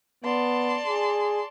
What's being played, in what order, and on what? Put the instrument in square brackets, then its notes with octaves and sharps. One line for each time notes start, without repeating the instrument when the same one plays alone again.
[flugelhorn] B3 [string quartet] D5 A5 C6
[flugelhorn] G#4